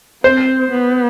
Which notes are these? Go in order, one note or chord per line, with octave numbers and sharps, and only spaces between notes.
C4 C5
B3